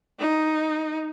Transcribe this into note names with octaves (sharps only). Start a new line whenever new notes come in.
D#4